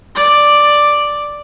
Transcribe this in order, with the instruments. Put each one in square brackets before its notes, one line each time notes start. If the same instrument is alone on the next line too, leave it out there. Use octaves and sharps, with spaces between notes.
[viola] D5